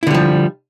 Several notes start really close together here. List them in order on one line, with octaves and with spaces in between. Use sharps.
E4 D3 G3 F3